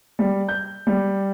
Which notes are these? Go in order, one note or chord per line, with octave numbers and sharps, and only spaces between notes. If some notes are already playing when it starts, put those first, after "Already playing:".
G3
G6
G3